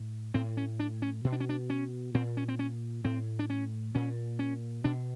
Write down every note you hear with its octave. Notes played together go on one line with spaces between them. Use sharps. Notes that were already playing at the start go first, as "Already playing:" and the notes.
Already playing: A2
A2 C4
C#4
D4
C#4
B2
D4
C#4
D4
C#4
A#2 C4
C#4
C4
C#4
A2 C4
D4
C#4
A#2 C#4
C#4
B2 D4